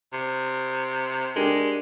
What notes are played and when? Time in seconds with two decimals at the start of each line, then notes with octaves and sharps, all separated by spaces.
0.13 C3
1.36 G#3 D4 G4 A#4